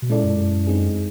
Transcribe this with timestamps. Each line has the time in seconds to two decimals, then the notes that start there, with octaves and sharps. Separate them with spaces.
0.02 B2
0.10 A#2 G#3 C#4 E4 A4 D5
0.24 F#2
0.67 G#3 C4 D#4 G#4